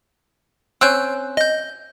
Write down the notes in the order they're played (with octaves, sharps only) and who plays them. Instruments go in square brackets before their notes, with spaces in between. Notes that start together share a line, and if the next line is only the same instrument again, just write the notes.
[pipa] C4 C#4 [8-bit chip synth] E6 F#6 G6
[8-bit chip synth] D#5 G6